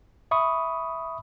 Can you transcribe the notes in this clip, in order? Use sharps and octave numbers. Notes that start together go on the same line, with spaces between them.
E5 B5 C#6 D#6